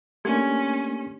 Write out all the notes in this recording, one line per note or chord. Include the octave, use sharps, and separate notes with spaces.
A3 A#3 C#4 D4 G4